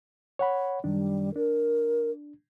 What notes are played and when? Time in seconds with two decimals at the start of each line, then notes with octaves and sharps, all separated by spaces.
0.39 C#5 F#5 B5
0.84 F#2 D#3 G3 D4
1.36 D4 A#4